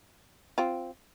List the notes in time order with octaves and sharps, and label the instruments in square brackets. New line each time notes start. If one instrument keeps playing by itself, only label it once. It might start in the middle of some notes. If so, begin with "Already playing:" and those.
[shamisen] C4 F4